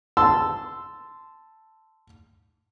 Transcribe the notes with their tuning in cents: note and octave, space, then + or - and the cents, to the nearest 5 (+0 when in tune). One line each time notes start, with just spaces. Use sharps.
A5 +0 C6 -15 E6 +0